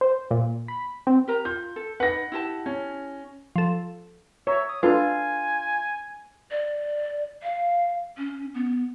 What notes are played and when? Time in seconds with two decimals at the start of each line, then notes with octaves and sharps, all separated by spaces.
0.01 C5
0.31 A#2
0.68 B5
1.07 C4
1.28 G4 A#4 A#5
1.45 F4 G6
1.76 A4
2.00 D#4 B4 F#5 A#6
2.32 E4 G4 A5
2.66 C#4
3.56 F3 A4
4.47 C#5 E5 A#5
4.69 D#6
4.83 D4 F4 A4 B4 G#5
6.51 D5
7.43 F5
8.18 C#4
8.54 B3